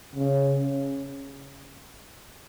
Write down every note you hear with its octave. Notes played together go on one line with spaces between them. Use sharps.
C#3